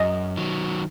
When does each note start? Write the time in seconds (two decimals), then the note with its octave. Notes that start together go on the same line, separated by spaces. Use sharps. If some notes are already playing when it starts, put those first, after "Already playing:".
Already playing: F#2 D#5
0.37 D#3 F#3